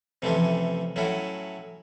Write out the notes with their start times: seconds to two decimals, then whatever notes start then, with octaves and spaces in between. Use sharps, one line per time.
0.22 F2 C3 E3 A3 C#4
0.96 A2 F#3 A3 C#4 E4